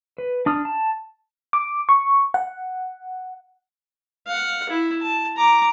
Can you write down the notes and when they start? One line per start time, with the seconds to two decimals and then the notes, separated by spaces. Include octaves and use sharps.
0.18 B4
0.46 D4 D#6 F6
0.65 A5
1.53 D6
1.89 C#6
2.34 F#5
4.27 F5 F#5
4.69 E4
5.02 A5
5.37 A#5 D6